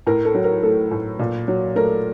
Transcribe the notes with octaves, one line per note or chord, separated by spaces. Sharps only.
A2 A#4
A4
F#3
A#4
A3 A4
A2
A#2
F#3
A3 A#4